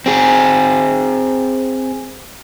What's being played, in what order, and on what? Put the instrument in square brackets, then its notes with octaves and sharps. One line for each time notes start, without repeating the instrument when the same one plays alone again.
[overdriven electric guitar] C4 G#4